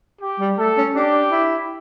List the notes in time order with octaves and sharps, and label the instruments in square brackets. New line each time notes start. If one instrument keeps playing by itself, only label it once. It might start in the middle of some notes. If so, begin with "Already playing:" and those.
[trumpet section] G4
[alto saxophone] G3
[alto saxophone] A3 [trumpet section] A4
[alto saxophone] C#4
[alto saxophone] D4 [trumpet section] G4
[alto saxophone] E4